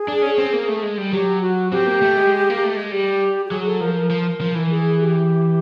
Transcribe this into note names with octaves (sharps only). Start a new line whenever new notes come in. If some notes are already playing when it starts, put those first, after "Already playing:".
Already playing: G#4
D4
C#4
C4
A#3
A3
G#3
G3
F#3 G4
F#4
C4 G4
A#3
A3
G#3
A#3
A3
G#3
G3 G4
G4
F#3 G#4
A4
F3 A#4
A#4
F3
F3
E3
G#4
G4